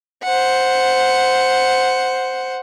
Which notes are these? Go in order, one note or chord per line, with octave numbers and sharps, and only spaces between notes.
C5 F#5